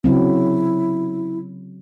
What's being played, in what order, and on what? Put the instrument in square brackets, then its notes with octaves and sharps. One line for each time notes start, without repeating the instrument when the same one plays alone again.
[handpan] C#3 F#3 C4 [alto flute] E4